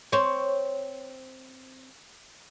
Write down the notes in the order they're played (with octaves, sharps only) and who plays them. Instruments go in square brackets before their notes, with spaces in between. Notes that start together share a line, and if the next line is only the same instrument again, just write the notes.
[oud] C4 C#5